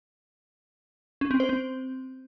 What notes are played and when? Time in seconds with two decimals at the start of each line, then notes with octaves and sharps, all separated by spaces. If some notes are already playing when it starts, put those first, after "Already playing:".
1.21 C#4
1.31 C4
1.40 C5
1.49 C4